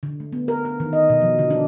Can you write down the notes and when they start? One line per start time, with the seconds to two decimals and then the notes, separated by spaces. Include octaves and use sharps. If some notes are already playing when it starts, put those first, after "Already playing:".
0.03 D3
0.20 A3
0.33 B3
0.48 A#4
0.65 A#4
0.80 D#3
0.93 D#5
1.10 B2
1.22 F3
1.39 D3
1.51 D4